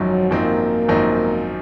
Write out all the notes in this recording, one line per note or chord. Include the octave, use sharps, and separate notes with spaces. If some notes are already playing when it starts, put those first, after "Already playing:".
Already playing: G#1 F#2 F3 F#3 C4 D#4
G#1 F#2 F3 A#3 C4 D#4
G#1 F#2 F3 C4 D#4